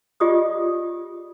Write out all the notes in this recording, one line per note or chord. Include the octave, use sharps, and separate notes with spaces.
F4 G4 G#4 D5 D#5 D#6